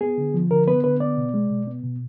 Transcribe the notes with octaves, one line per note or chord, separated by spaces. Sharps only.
B3 G#4
D3
F3
D3 A#4
B3 B4
D3 B4
B3 D5
B2
G#3
B2
B3
B2